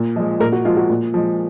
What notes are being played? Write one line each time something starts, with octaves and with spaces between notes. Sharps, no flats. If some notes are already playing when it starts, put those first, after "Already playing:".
Already playing: A#2
F3 G#3 D#5
A#2 A#4
F#4
F3 G#3 F4
F#4
A#2
F3 G#3